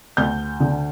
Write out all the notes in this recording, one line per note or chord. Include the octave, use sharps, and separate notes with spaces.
D2 G6
D3